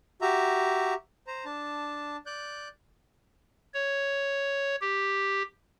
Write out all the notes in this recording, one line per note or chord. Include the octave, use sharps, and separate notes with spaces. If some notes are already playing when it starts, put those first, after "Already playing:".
F#4 G4 E5 A#5
C5 A#5
D4 A5
D5 F#6 G6
C#5
G4